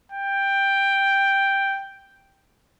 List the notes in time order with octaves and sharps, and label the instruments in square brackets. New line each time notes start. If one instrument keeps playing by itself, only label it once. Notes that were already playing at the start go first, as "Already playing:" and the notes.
[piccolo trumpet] G5